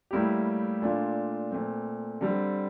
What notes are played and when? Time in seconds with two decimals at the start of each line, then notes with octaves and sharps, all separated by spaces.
0.11 A2 G3 A#3 E4 G4
0.82 A#2 A3 D4 F4
1.51 A#2 A3 C4
2.21 D3 G3 C4